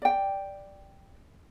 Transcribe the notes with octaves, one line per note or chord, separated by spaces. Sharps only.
D5 G5